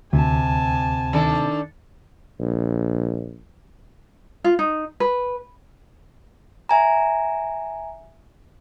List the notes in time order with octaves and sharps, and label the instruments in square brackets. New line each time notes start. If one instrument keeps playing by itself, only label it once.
[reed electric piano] D2 [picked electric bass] C3 [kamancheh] G#5 A5
[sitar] D#3 D4 A4
[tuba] A#1
[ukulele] F4
D#4
B4
[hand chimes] E5 G#5 A#5